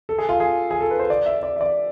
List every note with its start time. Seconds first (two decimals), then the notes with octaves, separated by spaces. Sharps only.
0.09 A4
0.18 G#4
0.29 F4
0.40 G#4
0.71 G#4
0.81 A4
0.91 B4
0.99 C5
1.10 D5
1.26 E5
1.43 D5
1.56 E5
1.61 D5